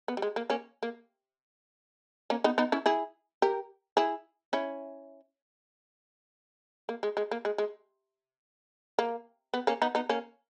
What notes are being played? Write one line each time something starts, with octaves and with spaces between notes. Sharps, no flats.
B3
G3
G#3
A#3
A#3 C#4
A#3
A#3 C#4
B3 D#4
B3 D#4
C#4 E4
E4 G#4
G4 A#4
E4 G#4
C#4 E4
A#3
G#3
G#3
A#3
G#3
G#3
A#3
B3
A#3 C#4
B3 D#4
B3 D#4
A#3 C#4